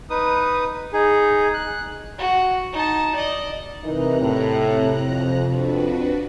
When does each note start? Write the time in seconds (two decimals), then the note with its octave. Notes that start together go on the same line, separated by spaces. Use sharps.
0.10 D#4 B4 D#6
0.93 D#4 G#4
1.54 F#6
2.19 F#4
2.73 D#4 A5
3.15 D5 D#5
3.84 C3 E3 D#4 A#4 A#5 F#6
4.20 A2
5.07 F2
5.42 D4 F#4 B4